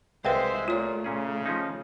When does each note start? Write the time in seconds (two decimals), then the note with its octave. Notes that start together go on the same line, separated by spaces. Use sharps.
0.25 C2 G#3 C4 B4 C5 E5 F5 G5
0.68 A#2 A3 F4 C#5
1.04 A#2 C#3 C#4 G#4
1.46 F3 C#4 D#4